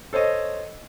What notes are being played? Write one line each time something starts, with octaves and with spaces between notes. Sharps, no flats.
A4 C5 C#5 D#5